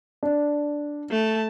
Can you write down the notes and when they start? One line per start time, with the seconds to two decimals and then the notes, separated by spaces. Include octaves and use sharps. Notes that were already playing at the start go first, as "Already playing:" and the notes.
0.23 D4
1.11 A3 A5